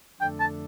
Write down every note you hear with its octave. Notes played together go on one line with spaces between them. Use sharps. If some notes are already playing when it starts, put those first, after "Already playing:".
F2 D3 A3 D4 A4 G5
A5